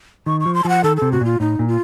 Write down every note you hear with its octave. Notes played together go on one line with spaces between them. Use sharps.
D#3 C#6
C#6
F3
C6
F3 F#5 A5
D#3 A4
C3 A4
A2 F#4
A#2 F4
A2 D#4
A#2
F4